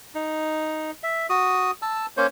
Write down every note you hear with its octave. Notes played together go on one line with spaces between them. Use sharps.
D#4
E5
F#4 D#6
A5 E6
A#3 C#4 C5 C#5